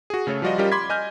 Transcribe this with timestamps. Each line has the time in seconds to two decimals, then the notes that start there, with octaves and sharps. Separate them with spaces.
0.10 F#4 G#4
0.27 C#3 A3 A4 C#5
0.42 F3 G3 F4 F#4 D5 D#5
0.58 G3 C#4 F4 G4 A#4 D#5
0.71 B5 C6 D6 G#6 B6
0.90 D#5 G#5 F6 G6